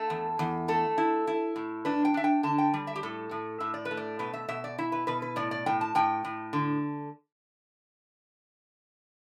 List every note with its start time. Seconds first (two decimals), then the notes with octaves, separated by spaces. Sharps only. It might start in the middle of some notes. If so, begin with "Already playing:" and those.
Already playing: A3 A4
0.10 E2
0.39 E2
0.68 A3 A4
0.98 E4
1.27 E4
1.56 A2
1.85 D4 B4
2.05 G5
2.14 D4 E5
2.24 G5
2.43 D3 A5
2.58 G5
2.74 G3
2.87 E5
2.96 G4
3.03 A2 A4
3.31 A2
3.60 A2 E5
3.74 D5
3.85 B4
3.91 A3
3.97 D5
4.19 B2 B4
4.33 E5
4.48 B2 E5
4.64 D5
4.78 E4 E5
4.92 B4
5.07 B2 B4
5.22 B4
5.36 A2 D5
5.51 D5
5.66 A2 G5
5.81 A5
5.95 A2 G5
6.24 A2
6.53 D3